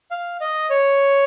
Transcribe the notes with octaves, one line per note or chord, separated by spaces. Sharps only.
F5
D#5
C#5